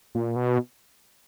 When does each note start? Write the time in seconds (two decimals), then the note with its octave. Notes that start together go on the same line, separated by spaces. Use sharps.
0.15 A#2
0.36 B2